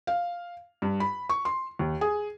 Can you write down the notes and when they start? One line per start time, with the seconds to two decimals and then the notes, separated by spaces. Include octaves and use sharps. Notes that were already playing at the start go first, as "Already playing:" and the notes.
0.07 F5
0.82 G2
1.00 B5
1.29 C#6
1.45 C6
1.79 D#2
2.01 G#4